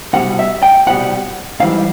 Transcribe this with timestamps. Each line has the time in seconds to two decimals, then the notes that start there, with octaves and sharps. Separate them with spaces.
0.13 C2 B2 G3 F#5
0.39 E5
0.63 G5
0.87 C2 B2 G3 F#5
1.60 G#2 E3 G3 F5